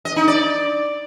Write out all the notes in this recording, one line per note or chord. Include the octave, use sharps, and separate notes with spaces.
D#5
D#4
D5